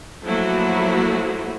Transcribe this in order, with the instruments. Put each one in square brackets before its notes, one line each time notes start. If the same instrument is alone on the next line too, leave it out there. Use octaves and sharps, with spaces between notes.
[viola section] F3 F#3 A3 A#3 E4 F#4